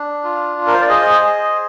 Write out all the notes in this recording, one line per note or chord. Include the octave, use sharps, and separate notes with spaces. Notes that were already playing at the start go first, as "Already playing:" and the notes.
Already playing: D4
F4
F4
A#4
C5
D5
G#4 C5 D#5
G#4